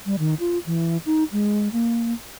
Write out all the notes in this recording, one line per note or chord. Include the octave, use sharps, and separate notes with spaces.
G3
D#3
F4
E3
D#4
G#3
A#3